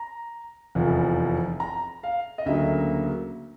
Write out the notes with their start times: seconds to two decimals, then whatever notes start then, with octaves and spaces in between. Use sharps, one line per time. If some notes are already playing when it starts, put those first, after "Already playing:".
Already playing: A#5
0.75 F1 E2 C3 F3
1.60 A#5
2.03 F5
2.38 D#5
2.46 D2 C#3 F#3 A#3 E5